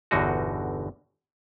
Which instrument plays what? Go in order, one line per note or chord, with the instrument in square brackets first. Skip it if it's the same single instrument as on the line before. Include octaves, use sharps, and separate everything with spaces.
[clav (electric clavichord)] G1 E2 B2 D3 D#4 F#4